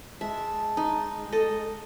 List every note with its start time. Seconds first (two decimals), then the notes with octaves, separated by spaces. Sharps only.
0.21 G#3 E5 A5
0.77 D#4
1.32 A4 D#5